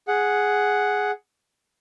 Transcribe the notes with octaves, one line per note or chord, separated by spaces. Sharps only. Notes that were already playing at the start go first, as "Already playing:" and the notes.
G#4 F#5